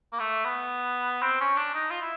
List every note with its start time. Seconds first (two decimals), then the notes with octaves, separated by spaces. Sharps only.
0.13 A#3
0.20 A3
0.45 B3
1.22 C4
1.41 C#4
1.57 D4
1.74 D#4
1.91 F4
2.01 E4